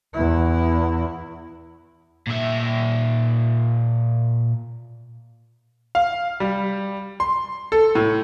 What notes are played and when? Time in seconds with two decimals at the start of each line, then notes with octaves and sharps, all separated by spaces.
0.15 E2 E4
2.27 A#2 E5
5.95 F5
6.40 G3
7.20 C6
7.72 A4
7.95 A2